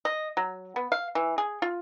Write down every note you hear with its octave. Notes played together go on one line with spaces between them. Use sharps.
D#5
F#3
B3
F5
E3
G#4
F4